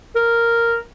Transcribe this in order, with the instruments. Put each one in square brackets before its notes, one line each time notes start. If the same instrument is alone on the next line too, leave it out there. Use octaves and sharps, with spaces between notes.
[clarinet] A#4